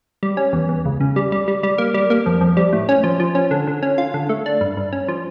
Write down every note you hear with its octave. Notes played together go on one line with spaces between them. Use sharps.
G3
C#4
E2
E2
C#2
C#3
G3
G3
G3
G3
A#3
G3
A#3
F2
F2
G3
A2
C#4
F3
F3
C#4
D3
D3
C#4
F4
D3
A3
D4
G2
G2
C#4
F3